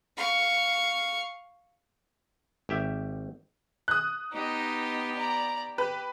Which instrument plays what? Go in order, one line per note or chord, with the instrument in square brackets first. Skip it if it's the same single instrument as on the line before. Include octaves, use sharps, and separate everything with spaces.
[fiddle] F5 C#6
[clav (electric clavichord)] G#1 G4 E5
[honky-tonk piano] D#6 F#6
[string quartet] B3 G4 [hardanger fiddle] D#4 D#5
[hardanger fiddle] D5 A#5
[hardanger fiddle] G4 [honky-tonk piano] B4